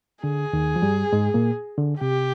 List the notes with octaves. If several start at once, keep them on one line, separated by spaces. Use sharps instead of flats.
D3 G#4
D#2 D#3
F3
G2 G3
G#2 G#3
A#2 A#3
D3
C3 G4